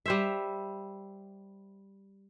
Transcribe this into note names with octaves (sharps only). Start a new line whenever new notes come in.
G3 C5 E5